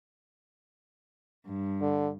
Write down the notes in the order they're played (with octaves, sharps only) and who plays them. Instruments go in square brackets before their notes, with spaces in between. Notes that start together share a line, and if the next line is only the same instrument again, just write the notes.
[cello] G2
[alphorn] D3